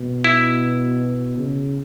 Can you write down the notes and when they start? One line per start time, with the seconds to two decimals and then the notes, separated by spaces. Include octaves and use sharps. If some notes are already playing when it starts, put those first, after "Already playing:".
Already playing: B2
0.24 E4
1.38 C#3